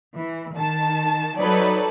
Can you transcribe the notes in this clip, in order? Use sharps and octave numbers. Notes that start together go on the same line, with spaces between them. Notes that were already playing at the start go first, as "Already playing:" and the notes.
E3
D#3 A5
F#3 D#4 A4 B4 C#5 D5